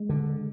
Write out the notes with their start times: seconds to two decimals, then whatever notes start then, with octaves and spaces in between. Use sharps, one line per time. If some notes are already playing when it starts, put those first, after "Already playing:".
Already playing: G#3
0.09 D3